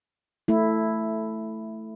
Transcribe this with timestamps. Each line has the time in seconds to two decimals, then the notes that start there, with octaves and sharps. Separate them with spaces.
0.48 A3 E4